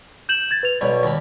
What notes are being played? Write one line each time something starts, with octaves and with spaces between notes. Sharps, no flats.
G6 E7 F#7
G#6 A6
B4 F7
B1 B2 C#5 D5
D#2 B5